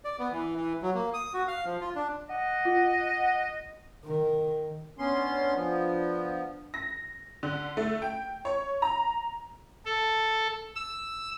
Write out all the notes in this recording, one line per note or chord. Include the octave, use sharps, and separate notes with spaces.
D5
B3
E3
E3
F#3
A#3
D#6
F#4
F5
F3
F4
D4
D#5 F#5
F4
D#3 A#4
B3 C#4 D4 C6
F3 B3
A#6
D3
A3
G5
C#5
A#5
A4
E6